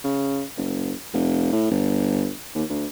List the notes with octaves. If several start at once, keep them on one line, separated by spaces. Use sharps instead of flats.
C#3
F#1
F1
A2
G1
D#2
D2